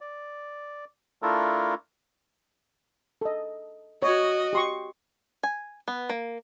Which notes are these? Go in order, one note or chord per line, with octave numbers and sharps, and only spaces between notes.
D5
A3 D4 E4 F4 A4 A#4
A4 D#5
F#4 C#5 D#5
G4 C6 C#6
G#5
B3
A#3